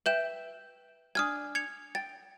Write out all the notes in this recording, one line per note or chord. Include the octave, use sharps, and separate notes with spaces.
B4 E5 G5 G6 E7
D4 F#4 G#5 D#6 F6 G#6
G#6 C#7 F7
G5 A6